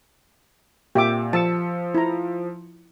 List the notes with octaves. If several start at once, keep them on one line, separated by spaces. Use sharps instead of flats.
A#2 G4 E5 D6
F3 A5 E6 C#7
E4 A#5